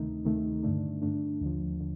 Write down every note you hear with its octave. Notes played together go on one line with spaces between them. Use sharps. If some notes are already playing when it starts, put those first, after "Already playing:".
Already playing: D2 C3 D#3 A3 D#4
D2 C3 D#3 A3 D#4
G2 D3 A3 D4
G2 D3 A3 D4
D#2 D3 F3
D3